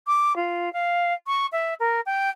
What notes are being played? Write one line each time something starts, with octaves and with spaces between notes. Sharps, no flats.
D6
F4
F5
C#6
E5
A#4
G5